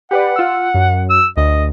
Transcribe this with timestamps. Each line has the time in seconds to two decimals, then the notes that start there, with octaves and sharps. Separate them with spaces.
0.11 G4 B4 D5 F#5
0.36 F4 E6
0.74 F#2
1.10 E6
1.37 D2 D#5